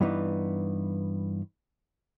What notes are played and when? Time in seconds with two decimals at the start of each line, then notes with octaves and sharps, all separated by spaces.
0.01 G2 E3 B3 D#4